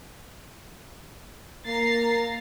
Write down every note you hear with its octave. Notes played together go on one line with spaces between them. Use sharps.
A#3 A#5 A6 C7